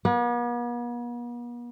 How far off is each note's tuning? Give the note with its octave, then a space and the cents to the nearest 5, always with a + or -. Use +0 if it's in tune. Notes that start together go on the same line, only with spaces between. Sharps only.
B3 -45